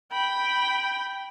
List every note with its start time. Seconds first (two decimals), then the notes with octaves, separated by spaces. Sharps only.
0.12 G5 B5